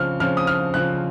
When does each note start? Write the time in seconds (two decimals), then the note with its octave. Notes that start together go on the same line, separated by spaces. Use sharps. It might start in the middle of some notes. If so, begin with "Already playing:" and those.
Already playing: C#3 F3 C4 F6
0.20 C#3 F3 C4 F6
0.37 D#6
0.47 F6
0.74 C#3 F3 C4 F#6